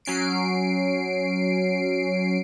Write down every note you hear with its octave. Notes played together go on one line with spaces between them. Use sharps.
F#3 C#4 C7 D7